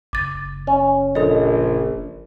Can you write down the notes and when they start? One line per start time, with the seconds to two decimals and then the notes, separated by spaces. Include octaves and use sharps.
0.13 F#1 D6 A6
0.67 C#4
1.15 A#1 A4 D#5